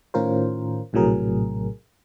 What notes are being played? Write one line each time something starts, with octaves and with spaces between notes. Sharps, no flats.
A2 D#3 C#4 F4 A#4 C5
A#1 A2 C3 F#3 G#4 A#4